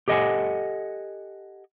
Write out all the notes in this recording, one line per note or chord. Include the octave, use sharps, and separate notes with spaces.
G4 A4 D#5 E5 F#5 G#5